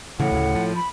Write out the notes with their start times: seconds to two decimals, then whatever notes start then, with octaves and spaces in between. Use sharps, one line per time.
0.20 A2 C#3 E3 F#5
0.32 D2 C#3
0.55 F3
0.76 B5